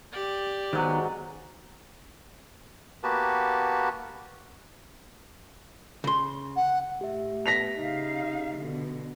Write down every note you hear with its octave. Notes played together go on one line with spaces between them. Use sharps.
G4 D5
G#2 D#3 F#3 B3
A#3 B3 F#4 G4 B4 A5
C#3 C6
F#5
A2 G4 E5
B3 A#6 B6 F7
C#3 D#4 F5
B2 D3